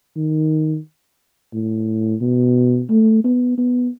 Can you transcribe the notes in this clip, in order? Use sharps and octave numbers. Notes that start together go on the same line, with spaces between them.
D#3
A2
B2
A3
B3
B3